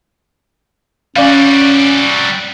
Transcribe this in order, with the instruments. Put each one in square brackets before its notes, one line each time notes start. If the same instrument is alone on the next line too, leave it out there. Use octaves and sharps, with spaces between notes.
[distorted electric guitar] G3 F#4 [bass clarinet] C#4 [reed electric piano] D5 F5